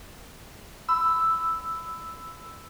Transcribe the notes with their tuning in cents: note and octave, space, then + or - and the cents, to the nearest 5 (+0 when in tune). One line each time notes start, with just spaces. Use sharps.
B5 +25 E6 +0